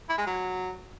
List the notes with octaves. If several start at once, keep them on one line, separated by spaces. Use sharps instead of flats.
E4
G#3
F#3